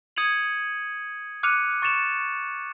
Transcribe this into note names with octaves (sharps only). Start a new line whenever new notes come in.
D#6 G#6 C#7 D#7 F7 F#7
D6 F6 F#6 C#7 D#7 F7
C#6 A6 C#7 E7 F7